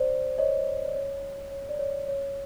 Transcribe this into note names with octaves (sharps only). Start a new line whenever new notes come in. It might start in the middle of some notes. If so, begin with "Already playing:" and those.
Already playing: C5 D5
C#5 D#5
D5
C#5
C#5
D5
C#5
C#5